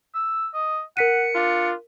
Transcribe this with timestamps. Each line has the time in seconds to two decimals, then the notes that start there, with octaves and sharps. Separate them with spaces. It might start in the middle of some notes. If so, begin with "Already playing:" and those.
0.14 E6
0.54 D#5
0.97 A#4 F#5 B6 C#7 D#7
1.35 D4 F4